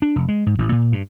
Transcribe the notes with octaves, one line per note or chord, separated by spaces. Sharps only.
D4
F1
G#3
G#2
A1
A#2
G2